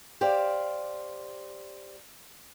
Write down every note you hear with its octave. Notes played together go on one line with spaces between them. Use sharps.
G4 C5 D5 F5